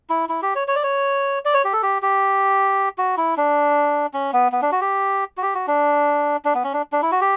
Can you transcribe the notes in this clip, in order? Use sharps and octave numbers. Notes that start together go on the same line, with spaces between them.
E4
E4
G4
C#5
C#5
D5
C#5
D5
C#5
G4
A4
G4
G4
F#4
E4
D4
C#4
B3
B3
D4
F#4
G4
F#4
G4
F#4
D4
D4
B3
C#4
D4
D4
E4
F#4
G4